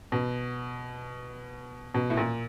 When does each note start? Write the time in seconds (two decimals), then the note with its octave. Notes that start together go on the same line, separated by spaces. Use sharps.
0.12 B2
1.94 B2
2.10 A2
2.17 A#2